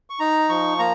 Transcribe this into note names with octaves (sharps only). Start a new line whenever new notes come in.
C#6
D#4 A#5
F3 C#6
A#3 A#5